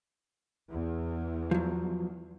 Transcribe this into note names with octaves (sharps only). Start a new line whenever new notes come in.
E2
F3 F#3